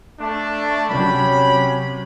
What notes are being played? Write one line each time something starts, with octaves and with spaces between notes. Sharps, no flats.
A3 D4
C3 F#3 C#4 G5 B5